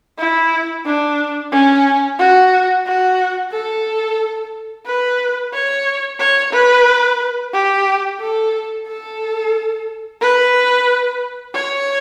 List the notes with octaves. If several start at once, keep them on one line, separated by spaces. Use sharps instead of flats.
E4
D4
C#4
F#4
F#4
A4
B4
C#5
C#5
B4
G4
A4
A4
B4
C#5